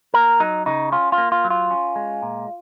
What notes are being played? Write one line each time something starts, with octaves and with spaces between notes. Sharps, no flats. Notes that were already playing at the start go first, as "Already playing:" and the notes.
A#3 A#4
F#3 D#4
C#3 D#4
C#4 F4
F4
A#3
F4
F#3
F4
C#4
G#3
A#2